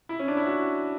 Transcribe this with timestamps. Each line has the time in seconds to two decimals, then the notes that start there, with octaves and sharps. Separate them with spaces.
0.09 E4
0.19 C#4
0.28 D4
0.37 E4
0.46 F#4